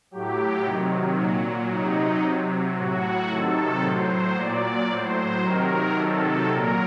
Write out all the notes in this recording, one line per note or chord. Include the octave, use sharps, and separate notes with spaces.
A2 F#3 G4
C3 D#3 F#3
A#2 F#3
C3 F#3 D#4
C3 F#3
A2 F#3 F#4
C3 D#3 F#3 A4
A2 F#3 C5
A#2 F#3 D5
A2 F#3 C5
C3 D#3 F#3 A#4
C3 D#3 F#3 A4
A#2 F#3 A#4